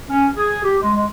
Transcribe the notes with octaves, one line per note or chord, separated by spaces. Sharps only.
C#4
G#4
G4
G#3
G#3